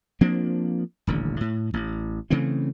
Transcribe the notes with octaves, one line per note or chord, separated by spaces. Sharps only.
F3 A#3 C4 D4
D#1 A1 D3
A2
A1
C#3 E3 A3 C4